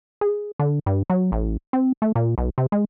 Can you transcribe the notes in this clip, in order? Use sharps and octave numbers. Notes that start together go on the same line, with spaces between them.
G#4
D3
G2
F#3
A1
C4
A3
A#2
B1
C3
G#3